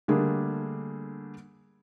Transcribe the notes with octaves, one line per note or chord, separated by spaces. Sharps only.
D3 G3 A3 A#3 D4 G#4